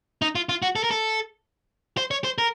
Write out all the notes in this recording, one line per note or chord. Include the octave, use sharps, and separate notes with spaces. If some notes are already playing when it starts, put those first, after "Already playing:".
D#4
F4
F4
F#4
A4
A#4
A4
C5
C#5
C5
A#4